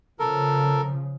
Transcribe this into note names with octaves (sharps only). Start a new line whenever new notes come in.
C#3 F3 A4 A#4